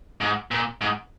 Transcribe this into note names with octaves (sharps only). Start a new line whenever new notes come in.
G#2
A#2
G#2